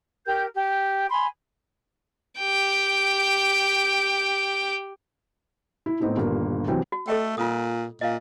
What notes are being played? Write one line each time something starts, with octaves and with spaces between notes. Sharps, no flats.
G4 A#4 G6
G4
G#5 B5 C6
G4 G5
E4
A2 B3 C4 D#4 E4
G1 D#2 A#2 A#3
C2 E3 F#3 C4 G5
F#4
A3 A4 D#5 G5
A#2 F4 D#6
A#2 D#5 F5